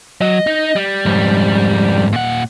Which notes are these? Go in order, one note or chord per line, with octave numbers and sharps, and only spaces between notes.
F#3 D#5
D#4
G3
F2 G#2
A#2 F#5